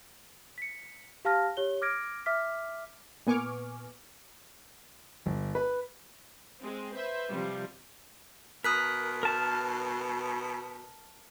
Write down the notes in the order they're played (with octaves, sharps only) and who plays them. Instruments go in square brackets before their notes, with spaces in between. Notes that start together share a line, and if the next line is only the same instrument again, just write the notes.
[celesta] B6 C#7
G4 F5 A5 F6 A#6
G4 C#5 G7
D6 F6 G#6 A#6 D7
E5 D6 F6 B6
[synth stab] A#2 B3 G#5 C#6 D6 F6
[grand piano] G1
B4
[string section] G#3 C4
B4 C5 E5
C3 F3 G3
[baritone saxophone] B2 [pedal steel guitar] A#4 [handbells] D#6 F#6 B6
[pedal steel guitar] A#4 A5 F6